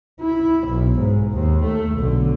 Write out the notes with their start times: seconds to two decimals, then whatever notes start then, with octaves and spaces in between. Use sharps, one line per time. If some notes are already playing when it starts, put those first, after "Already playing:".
0.21 E4
0.68 B1
0.99 G#2
1.32 D#2
1.65 A3
1.95 B1 D3